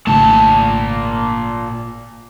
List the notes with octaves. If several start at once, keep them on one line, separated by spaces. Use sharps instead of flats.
G#1 A#2 C#3 A3 A5